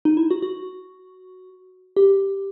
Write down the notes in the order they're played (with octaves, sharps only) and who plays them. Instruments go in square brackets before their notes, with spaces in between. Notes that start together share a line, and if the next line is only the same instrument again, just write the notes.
[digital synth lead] D#4
E4
F#4
F#4
G4